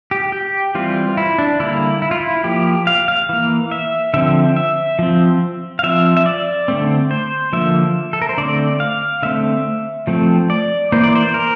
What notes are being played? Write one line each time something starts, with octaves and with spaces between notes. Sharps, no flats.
G4
G4
E3 G3 C4 F4
E4
D4
D3 G3 A#3 E4
E4
F4
E4
F3 A#3 G4
F5
F5
E3 A#3
E5
D3 F3 C4 E5
E5
F3 C4
F5
F3 C4 E5
E5
D5
D3 A3 C4
C5
D3 F3 A#3 E5
A4
A#4
C5
D3 A3 C4 D5
F5
D3 A3 C4 E5
F3 A3 C4
D5
E3 A#3 C5
D5
C5
A#4